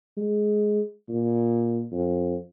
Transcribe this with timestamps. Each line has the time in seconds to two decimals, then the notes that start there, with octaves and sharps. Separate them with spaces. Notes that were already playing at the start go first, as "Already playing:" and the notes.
0.17 G#3
1.09 A#2
1.92 F2